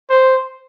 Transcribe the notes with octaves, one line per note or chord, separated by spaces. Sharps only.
C5